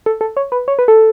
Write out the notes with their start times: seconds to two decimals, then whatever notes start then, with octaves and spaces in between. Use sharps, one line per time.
0.06 A4
0.21 A4
0.37 C#5
0.52 B4
0.68 C#5
0.79 B4
0.88 A4